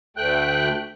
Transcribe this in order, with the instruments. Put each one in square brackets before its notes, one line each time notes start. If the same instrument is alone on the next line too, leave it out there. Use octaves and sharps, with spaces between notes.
[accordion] D2 A3 G5 F#6